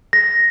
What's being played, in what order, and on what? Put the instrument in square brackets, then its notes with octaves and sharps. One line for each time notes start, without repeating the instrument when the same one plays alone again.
[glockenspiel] A#6